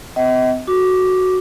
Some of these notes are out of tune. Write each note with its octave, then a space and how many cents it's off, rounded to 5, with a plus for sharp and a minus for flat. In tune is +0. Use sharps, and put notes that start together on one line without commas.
C4 -40 D#5 +40 F#5 +45
F#4 +0 D6 +0